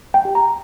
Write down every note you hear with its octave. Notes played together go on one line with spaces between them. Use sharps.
G5
G4
A#5